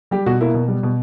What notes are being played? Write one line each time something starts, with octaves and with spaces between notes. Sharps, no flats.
G3 G4
B2 F#4
A#3 E4
B2
G3
B2